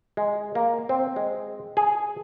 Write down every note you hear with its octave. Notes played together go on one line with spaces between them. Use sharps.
G#3
A#3
C4
G#3
G#4